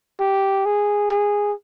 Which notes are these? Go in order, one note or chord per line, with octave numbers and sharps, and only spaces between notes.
G4
G#4
G#4